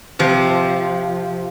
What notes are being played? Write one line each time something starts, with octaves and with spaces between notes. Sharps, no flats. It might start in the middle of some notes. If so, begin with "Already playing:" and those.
C3 F3